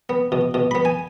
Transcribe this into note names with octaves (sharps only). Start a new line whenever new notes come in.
B3
B2
B2
B3 B5
G#5